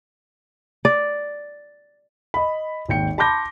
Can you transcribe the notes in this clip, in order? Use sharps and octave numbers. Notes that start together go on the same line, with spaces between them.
D5
D#5 B5
G#1 D#2 G5 C#7
A5 B5 C6 D6 G6 A#6